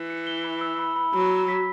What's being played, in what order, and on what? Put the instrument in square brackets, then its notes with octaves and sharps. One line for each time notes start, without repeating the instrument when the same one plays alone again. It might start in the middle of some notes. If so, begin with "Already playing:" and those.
Already playing: [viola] E3
[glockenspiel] C#7
G7
B5
E6
B5
B5
[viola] F#3 [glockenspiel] B5
[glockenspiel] B5
B6